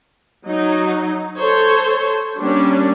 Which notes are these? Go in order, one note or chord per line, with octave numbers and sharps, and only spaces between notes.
F#3 D#4
A4 C5 C#5
G3 A#3 C#4 D4